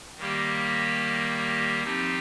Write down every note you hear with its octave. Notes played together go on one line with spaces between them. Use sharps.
D#3 G3 A#3 G4
F3 C4 D#4 G4